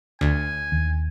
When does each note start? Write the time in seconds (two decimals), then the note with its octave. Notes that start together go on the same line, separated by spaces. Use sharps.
0.21 D2 G#5
0.72 D#2